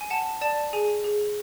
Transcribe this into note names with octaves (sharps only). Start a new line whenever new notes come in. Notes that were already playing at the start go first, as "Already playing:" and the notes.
G#5
F#5 A5
D5 A5
G#4 G#5
G#4